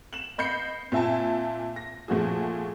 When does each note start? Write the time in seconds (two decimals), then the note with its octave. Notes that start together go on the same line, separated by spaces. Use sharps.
0.13 E7 F#7
0.38 D#5 B5 G6 C7 C#7
0.92 A#2 C4 E5 G#5 A5
1.76 A#6
2.08 A#2 F3 A3 F#4 G#4